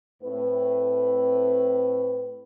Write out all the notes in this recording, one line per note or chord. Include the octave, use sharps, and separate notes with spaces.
A2 C4 B4